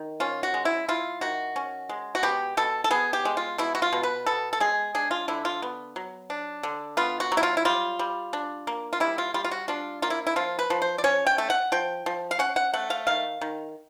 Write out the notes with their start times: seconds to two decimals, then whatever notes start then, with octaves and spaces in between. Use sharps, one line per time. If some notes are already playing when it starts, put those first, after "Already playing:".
Already playing: D#3
0.20 C#4 F4
0.43 F#4
0.54 G#3
0.65 E4
0.88 E4 F4
1.21 D#3 F#4
1.56 C#4
1.89 G#3
2.15 F#4
2.23 B2 G4
2.57 B2 A4
2.84 A4
2.90 B3 G#4
3.13 G4
3.25 G#3
3.37 F4
3.58 B2 E4
3.75 F#4
3.82 F4
3.93 B2
4.03 B4
4.26 B3 A4
4.53 A4
4.60 G#3 G#4
4.95 D4 G#4
5.11 F4
5.28 D3 E4
5.45 F4
5.62 B3
5.96 F#3
6.30 D4
6.63 D3
6.97 B3 F4
7.20 F#4
7.32 F#3
7.37 E4
7.43 F4
7.57 E4
7.65 G3 F4
7.99 G3
8.33 D4
8.67 A#3
8.93 F4
9.00 G3 E4
9.18 F4
9.34 G3 F4
9.44 F4
9.51 F#4
9.68 D4 F4
10.02 A#3 F4
10.10 E4
10.27 E4
10.36 F3 F4
10.59 B4
10.70 F3
10.82 C5
10.98 D5
11.04 C#4 C#5
11.27 G5
11.38 A3
11.50 F#5
11.72 F3 G5
12.06 F3
12.31 F5
12.39 C#4 F#5
12.56 F#5
12.74 A3 F#5
12.90 F5
13.07 D#3 F5
13.41 D#3